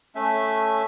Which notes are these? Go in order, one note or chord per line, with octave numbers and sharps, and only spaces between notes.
A3 C#4 E5